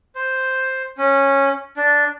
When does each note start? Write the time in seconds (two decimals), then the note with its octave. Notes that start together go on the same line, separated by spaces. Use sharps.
0.15 C5
0.98 C#4
1.77 D4